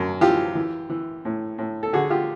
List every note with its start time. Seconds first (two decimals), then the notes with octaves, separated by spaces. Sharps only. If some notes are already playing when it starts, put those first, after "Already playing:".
Already playing: F#2
0.21 E3 F4 G4
0.55 E3
0.90 E3
1.25 A2
1.58 A2
1.83 A4
1.93 D3 F#4 G#4
2.10 F4 G4